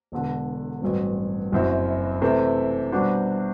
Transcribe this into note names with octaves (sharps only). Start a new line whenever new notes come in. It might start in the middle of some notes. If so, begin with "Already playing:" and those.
E1 E2 D3
A1 G2 F#3 C4
F#1 F#2 F#3 C4 E4
C3 E3 A3 C4
B2 G3 D4 F#4 C5